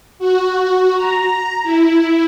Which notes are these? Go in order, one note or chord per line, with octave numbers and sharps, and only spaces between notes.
F#4
A#5
E4